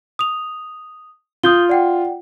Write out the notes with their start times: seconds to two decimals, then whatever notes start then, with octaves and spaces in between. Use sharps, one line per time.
0.19 D#6 F7
1.43 F4 D#6 G6 G7
1.69 D5 F#5 G5